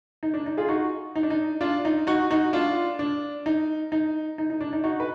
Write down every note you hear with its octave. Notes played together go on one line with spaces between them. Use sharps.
D#4
D4
D#4
F4 G#4
D#4 F#4
D#4
D4
D#4
D4 F4
D#4
D#4 F#4
D#4 F#4
D4 F4
D4
D#4
D#4
D#4
D#4
D4
D#4
D#4 F#4
B4